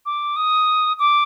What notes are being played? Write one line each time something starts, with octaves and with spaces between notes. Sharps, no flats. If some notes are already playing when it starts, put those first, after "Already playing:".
D6
D#6
D6